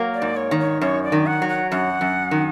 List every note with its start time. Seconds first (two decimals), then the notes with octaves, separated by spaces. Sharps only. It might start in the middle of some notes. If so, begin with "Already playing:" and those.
Already playing: F#3 A#3
0.14 D5
0.22 G#2
0.36 C#5
0.51 D#3
0.59 C#5
0.81 F#2 C#5
1.04 D5
1.12 D#3
1.26 F#5
1.42 F#3
1.49 F#5
1.71 F#2 F#5
2.01 F#2
2.31 D#3